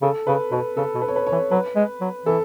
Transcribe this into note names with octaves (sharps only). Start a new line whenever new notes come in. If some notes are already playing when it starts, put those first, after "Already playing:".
C#3 A4
C#3 B4
B2 B4
C#3 A4
B2
B4
C#5
B4
C#5
E3
F#3 B4
G#3
F#3
E3 A4